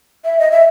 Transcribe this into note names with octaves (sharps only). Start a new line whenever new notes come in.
E5
D#5
E5